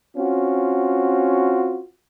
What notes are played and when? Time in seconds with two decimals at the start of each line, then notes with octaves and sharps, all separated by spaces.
0.17 C4 C#4 F4 F#4